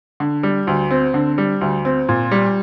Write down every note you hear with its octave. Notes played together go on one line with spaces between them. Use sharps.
D3
G3
D2
C4
D3
G3
D2
C4
A#2
G3